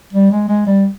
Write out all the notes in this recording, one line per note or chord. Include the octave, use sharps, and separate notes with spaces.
G3
G#3
G#3
G3